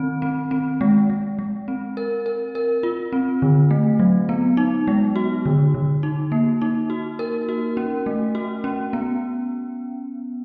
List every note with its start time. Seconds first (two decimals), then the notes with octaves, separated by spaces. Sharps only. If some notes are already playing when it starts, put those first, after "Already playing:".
Already playing: D#3 C4
0.22 C4
0.51 C4
0.81 G#3
1.10 G#3
1.39 G#3
1.68 C4
1.97 A#4
2.26 A#4
2.55 A#4
2.83 F4
3.12 C4
3.42 D3
3.71 A3
3.99 F#3
4.29 B3
4.57 D#4
4.88 G#3
5.16 F#4
5.46 D3
5.74 D3
6.03 D#4
6.32 A#3
6.62 D#4
6.90 F#4
7.19 A#4
7.49 F#4
7.77 C#4
8.06 A3
8.35 F#4
8.64 C#4
8.93 B3